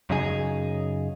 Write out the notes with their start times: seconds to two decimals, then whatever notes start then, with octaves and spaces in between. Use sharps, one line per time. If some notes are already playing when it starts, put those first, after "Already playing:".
0.10 F#2 C#3 D#4 G#4